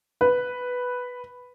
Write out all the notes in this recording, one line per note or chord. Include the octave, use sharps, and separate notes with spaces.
B4